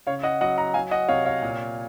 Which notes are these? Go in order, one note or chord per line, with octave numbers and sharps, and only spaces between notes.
C#3 C#5 F5
D#5 F#5
F#3 D#5 F#5
F#5 A#5
F#3 F5 G#5
D#5 F#5
C3 C#5 F5
C#5 F5
A#2